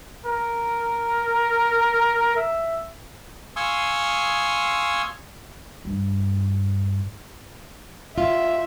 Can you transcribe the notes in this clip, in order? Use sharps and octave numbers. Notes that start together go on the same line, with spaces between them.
A#4
E5
F5 G#5 C6 C#6 D#6 E6
G2
F4 E5